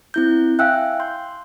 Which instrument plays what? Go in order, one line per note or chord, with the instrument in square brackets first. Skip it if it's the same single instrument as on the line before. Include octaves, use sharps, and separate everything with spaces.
[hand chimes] C4 E4 G6
[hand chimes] E5 G5 G#5 [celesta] F5 E6 F#6
[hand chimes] C6 G6